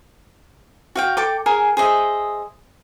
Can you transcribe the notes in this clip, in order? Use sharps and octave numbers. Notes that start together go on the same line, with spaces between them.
F#4 F5 G5
A4 G5 D6
G#4 A#4 G#5
G#4 C5 D#5 E5